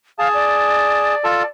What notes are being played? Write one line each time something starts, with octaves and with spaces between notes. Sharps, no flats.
G#4 F5 A5
D5
F4 A4 A5